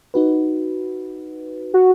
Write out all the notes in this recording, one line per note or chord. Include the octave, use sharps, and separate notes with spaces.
D#4 F#4 B4
F#4